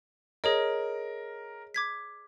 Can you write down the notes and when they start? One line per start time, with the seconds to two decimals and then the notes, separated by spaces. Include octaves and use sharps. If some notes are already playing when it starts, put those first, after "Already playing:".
0.44 G#4 A#4 C#5 D#5
1.74 D6 G#6 B6